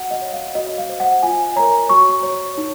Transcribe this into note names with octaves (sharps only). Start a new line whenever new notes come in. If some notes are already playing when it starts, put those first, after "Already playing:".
Already playing: F#4 F#5
D#5
C#5
F5
F#4 D#5
F5
C5
F#5
F4 G#5
A#4 C#5 A#5
F#4 C#6
C#5
D#4